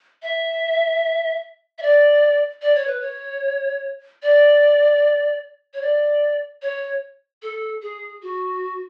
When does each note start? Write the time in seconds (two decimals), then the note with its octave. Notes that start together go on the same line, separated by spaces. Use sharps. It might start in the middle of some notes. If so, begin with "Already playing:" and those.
0.22 E5
1.78 E5
1.82 D5
2.62 D5
2.75 C#5
2.87 B4
3.00 C#5
4.22 D5
5.74 C#5
5.82 D5
6.62 C#5
7.42 A4
7.82 G#4
8.22 F#4